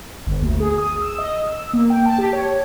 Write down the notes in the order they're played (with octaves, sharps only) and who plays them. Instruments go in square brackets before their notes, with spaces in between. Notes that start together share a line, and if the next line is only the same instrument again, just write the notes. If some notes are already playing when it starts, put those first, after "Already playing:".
[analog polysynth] G1
D2
G#4
D#6
E6
D#5
E6
A#3
G5
A5
G4
C#5